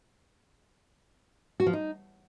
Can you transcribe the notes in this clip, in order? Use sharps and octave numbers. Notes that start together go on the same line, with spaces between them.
F#4
F3
D#4